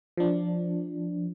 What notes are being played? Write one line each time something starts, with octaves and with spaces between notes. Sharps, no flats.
F3 D4